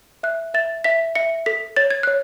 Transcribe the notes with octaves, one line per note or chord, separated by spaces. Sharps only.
E5 F#6
E5 A6
E5 B6
E5 C#7
A4 B6
C#5 A6
G#6
C#5 F#6